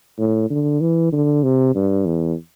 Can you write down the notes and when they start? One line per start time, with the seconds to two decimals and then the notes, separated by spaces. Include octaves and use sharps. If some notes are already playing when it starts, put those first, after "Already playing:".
0.18 A2
0.50 D3
0.81 E3
1.12 D3
1.43 C3
1.75 G2
2.06 E2